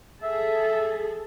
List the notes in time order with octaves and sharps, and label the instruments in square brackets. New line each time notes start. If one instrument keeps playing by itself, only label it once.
[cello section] G#4 A4 [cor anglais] E5